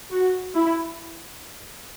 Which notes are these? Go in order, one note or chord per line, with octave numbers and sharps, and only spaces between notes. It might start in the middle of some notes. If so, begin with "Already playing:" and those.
F#4
E4